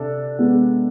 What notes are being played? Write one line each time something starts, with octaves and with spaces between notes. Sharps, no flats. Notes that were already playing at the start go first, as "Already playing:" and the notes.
Already playing: C3 D4 A4
G#3 B3